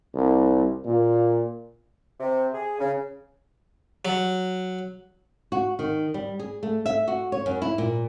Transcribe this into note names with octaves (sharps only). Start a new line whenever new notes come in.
C2
A#2
C3
G#4
C#3
F#3
F#4
D#3
G3
G#4
A3
E5
F#4
C#5
F#2
E4
A#2